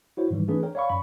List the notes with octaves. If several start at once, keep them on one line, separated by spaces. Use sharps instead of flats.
E4 F#4 C5 C#5
G#2 D#3 E3 G3
E3 A3 C4 D4 G#4 B4
A#4 C#5 G5
C#5 D5 F5 B5 C#6
F#2 B5 C#6